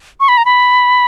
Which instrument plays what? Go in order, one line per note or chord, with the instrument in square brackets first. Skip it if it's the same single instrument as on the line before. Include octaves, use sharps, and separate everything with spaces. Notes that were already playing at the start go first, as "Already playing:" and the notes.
[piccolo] C#6
B5
A#5
B5